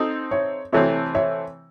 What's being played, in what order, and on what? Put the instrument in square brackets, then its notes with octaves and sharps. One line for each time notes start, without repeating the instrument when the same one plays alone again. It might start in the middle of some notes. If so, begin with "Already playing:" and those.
Already playing: [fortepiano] C4 D#4 A4 D#5
[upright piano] C#5 E5
[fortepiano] C3 E3 A3 C4 [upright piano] C#5 E5
[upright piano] C#5 E5